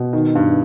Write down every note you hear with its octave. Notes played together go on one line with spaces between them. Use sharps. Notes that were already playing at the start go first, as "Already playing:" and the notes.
Already playing: B2
D#3
G2